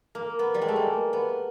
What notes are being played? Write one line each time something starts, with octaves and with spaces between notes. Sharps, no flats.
A#3
B3
G3
G#3
A3
A#3
B3